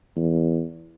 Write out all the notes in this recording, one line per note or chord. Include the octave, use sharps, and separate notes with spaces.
E2